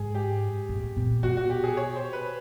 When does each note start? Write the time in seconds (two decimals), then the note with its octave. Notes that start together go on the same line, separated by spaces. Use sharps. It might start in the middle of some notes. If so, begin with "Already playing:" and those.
Already playing: G#2 G#4
0.15 G4
0.69 A2
0.96 A#2
1.23 B2 F#4
1.37 F#4
1.50 G4
1.64 G#4
1.77 C#5
1.96 C5
2.13 B4